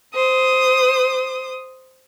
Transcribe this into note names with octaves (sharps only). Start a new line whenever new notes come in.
C5 D#6